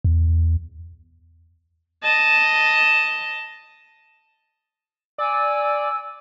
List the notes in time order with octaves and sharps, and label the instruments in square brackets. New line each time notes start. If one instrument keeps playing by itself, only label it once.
[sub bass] E2
[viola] D#5 A5
[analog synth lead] D5 [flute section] G#5 E6